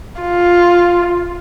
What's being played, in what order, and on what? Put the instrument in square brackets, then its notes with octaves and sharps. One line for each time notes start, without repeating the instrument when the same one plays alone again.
[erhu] F4